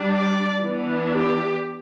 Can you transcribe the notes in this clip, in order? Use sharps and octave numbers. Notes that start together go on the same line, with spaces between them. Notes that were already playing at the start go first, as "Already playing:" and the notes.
Already playing: G3 D4
D5
E3 B3 D4
G4